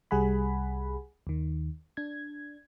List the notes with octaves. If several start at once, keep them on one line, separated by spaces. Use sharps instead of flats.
C2 G3 G#4 F#5 G#5 B5
D#2 D#3
D4 G#6